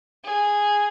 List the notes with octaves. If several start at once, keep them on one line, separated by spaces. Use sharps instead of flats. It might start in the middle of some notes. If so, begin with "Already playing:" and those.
G#4